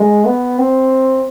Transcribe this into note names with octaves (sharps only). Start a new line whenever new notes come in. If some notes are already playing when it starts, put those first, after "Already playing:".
Already playing: G#3
B3
C4